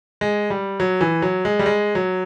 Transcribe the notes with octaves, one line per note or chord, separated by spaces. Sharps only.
G#3
G3
F#3
E3
F#3
G#3
G3
G#3
F#3